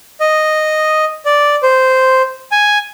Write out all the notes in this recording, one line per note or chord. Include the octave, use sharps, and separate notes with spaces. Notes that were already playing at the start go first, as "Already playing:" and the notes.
D#5
D5
C5
G#5